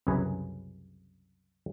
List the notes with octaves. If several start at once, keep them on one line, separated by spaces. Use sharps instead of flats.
C2 F#2 C#3 G#4 B4 A#5